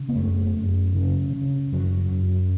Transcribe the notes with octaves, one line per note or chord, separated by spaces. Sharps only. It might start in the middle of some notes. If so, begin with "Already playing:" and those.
Already playing: C#3
B3
F#2 A3
F#2
C#3
C#3
F#2 F#3
F#2